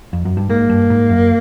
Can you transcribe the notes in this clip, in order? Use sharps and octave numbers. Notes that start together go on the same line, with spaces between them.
F2
F#2
G2
G#2 A#3
G2
G#2
F#2